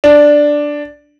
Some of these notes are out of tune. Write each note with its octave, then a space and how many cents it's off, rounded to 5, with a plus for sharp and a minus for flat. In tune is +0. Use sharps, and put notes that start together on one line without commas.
D4 +0